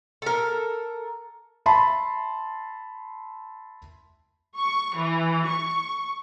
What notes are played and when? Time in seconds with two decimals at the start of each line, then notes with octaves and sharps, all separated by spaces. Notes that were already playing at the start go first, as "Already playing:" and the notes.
0.22 A4 A#4
1.66 E5 A5 B5 C6
4.58 C#6
4.96 E3
5.47 C#6